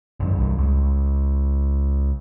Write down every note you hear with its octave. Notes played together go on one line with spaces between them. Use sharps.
G#1 F#2
C2 G2
C#2